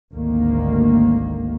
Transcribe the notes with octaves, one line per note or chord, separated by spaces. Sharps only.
G#1 D2 D#3 A#3